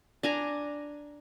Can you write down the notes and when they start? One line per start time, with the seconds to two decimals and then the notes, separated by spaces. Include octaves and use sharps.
0.23 D4 G#5 A#5